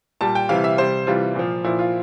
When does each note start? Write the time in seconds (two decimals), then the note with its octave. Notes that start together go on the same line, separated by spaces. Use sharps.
0.21 A#2 G3 A5
0.35 G5
0.49 C3 E3 G3 F5
0.64 E5
0.78 C3 G3 C5
1.07 C3 E3 G3 F4
1.35 A#2 F3
1.64 A#2 F3 E4
1.79 F4